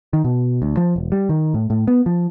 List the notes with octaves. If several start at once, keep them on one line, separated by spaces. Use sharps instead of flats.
D#3
B2
D2
F3
E1
G3
D#3
A2
A2
B3
F3